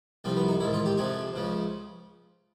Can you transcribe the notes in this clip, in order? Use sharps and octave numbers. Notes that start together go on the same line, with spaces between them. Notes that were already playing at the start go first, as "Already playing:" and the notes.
C2 C3 F3 C4
B3
D#4
A1 G#2 D#3 E4
F4
G4
F2 C3 F3 G#4
C#2 C#3 F3